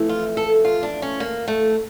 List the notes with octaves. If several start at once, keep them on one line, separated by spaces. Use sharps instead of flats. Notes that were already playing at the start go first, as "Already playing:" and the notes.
Already playing: F2 E3 A3
F4
A4
F4
D4
C#4
A#3
A3